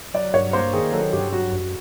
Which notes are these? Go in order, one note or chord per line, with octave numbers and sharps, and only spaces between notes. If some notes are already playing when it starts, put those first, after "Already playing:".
F#3 D5
G2 C#5
A#3 C5
D#3 G#4
F#3 A4
G2 G4
F#3 F#4
F#2